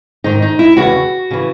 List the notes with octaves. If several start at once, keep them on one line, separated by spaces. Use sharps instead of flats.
G#2 D#3 D#4
D#4
E4
E2 C#3 E3 F#4
C#3 E3